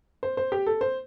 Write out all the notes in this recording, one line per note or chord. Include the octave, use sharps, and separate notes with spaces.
C5
C5
G4
A4
C5